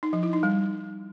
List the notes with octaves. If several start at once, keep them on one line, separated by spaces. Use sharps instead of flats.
D#4
F3
E4
D#4
G3